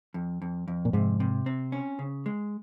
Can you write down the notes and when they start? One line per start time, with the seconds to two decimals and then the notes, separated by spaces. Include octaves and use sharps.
0.14 F2
0.42 F2
0.68 F2
0.85 A#2
0.93 G#2 C3
1.20 C3
1.46 C4
1.72 C#4
1.99 C#3
2.26 G#3